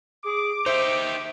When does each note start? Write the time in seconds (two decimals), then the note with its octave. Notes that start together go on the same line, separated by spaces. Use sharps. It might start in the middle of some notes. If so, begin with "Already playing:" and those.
0.24 G#4 D6
0.66 D#4 G4 C5 E5